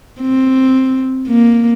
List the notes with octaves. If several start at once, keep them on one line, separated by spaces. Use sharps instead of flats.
C4
A#3